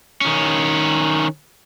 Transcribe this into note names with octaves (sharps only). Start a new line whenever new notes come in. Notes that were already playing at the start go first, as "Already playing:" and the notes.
D#3 C#4